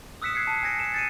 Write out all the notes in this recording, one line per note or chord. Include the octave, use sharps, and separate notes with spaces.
D#6 E6 F#6 B6 C#7 E7
E6 F#6 G#6 C7 C#7
A5
G#5 G#6 A#6 C#7
C#7 E7
A6 C#7 D#7